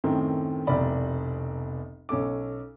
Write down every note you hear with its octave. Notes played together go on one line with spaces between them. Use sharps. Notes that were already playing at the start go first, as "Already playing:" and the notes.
F#2 A2 D#3 C4
F1 C2 B2 D5 B5
B1 C#4 A4 D6